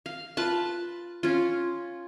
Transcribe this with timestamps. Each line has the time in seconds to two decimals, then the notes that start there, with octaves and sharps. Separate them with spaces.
0.06 F5
0.37 F4 B4 A5
1.23 C#4 F4